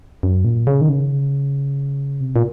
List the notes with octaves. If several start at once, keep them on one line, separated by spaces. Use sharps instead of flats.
F#2
A#2
C#3
D#3
C#3
C3
A#2